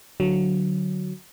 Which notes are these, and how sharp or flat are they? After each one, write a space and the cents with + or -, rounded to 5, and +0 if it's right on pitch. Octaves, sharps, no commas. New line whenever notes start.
D3 +5 F#3 +0